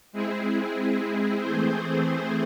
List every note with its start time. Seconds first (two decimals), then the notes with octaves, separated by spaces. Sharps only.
0.12 G#3 C4 E4 G#4
1.40 E3 A3 C4 G#4 C5